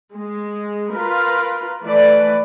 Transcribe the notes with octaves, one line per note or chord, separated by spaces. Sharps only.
G#3
F4 A#4 B4
E3 A3 B4 D5